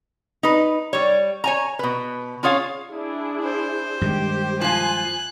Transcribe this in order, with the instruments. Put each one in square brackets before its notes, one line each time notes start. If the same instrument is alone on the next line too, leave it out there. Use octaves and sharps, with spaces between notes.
[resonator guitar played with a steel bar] D#4 B4
G3 C#5
C#5 G#5 A#5
B2 B4
C#4 F4 G#4 C#5 F5
[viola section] D4 E4 G#4
[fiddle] C5
[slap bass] G2 D#3 G#3 [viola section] G4
[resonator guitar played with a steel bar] F3 F4 [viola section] G#5 [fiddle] F#6